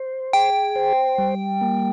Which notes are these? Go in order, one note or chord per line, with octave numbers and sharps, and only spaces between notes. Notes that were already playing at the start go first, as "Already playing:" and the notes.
Already playing: C5
G#4 G5
C5
G3
A#3